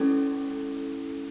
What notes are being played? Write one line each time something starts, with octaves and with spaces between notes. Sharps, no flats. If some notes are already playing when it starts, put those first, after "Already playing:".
Already playing: G#3 C#4 E4 A4